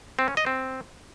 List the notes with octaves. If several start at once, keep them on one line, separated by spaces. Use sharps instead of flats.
C4
C#4
D#5
C4